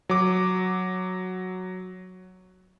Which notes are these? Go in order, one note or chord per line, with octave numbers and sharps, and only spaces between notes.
F#3 D6